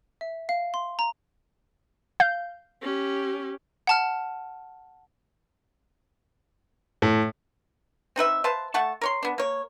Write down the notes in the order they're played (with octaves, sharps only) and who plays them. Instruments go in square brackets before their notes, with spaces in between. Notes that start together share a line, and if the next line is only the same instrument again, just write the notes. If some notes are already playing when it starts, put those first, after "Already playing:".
[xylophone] E5
F5
C6
A#5
[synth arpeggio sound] F5 G6
[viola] C#4 G4
[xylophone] F#5 A5 F6
[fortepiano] A2
[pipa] C4 D#4 B4 E5
B4 C5 F5 A5
A3 F#5 A5 C#6
A#4 C#5 C6
B3 D4
A#3 C#5